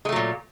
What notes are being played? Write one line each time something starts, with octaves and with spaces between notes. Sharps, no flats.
A#2 F#3 G#3 A3